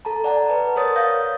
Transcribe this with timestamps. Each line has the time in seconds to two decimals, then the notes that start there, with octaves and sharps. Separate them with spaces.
0.05 A4 A5 A#5
0.24 D5 F#5 A5 A#5
0.50 B4
0.76 A#4 C5 C#5 D#6 A6
0.96 F5 D#6 G6 A6 A#6